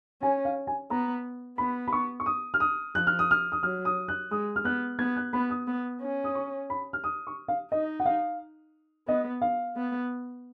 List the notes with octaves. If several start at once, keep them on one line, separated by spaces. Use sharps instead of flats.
C#4 G#5
F5
G#5
B3 A#5
B3 B5
B5
C#6
C#6
D#6
F6
D#6
F3 F#6
F6
D#6
F6
D#6
F#3 F6
D#6
F#6
G#3 D#6
F6
B3 F#6
B3 G#6
F#6
B3 B5
D#6
B3
C#4
D#6
C#6
B5
F6
D#6
C#6
F5
D#4 D#5
F#5
F5
B3 D#5
F5
B3